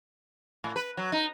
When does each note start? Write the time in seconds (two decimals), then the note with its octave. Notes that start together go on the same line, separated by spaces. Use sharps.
0.64 A2
0.76 B4
0.97 F#3
1.12 D#4